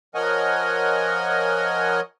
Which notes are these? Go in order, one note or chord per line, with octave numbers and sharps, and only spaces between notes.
F3 A#4 C#5 D#5 F#5 G#5